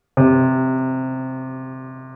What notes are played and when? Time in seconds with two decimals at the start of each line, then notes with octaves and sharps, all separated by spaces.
0.17 C3